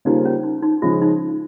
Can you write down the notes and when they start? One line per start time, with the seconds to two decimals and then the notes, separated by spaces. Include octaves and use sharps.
0.05 C#3 G3 A#3 D#4 F4 C5
0.25 C#4
0.43 D#4
0.63 D#4
0.82 C#3 F3 G#3 F4
1.02 D#4